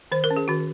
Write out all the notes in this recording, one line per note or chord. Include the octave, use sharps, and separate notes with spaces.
D#3 C5
A#4
C#4
G#4
D#3 F#4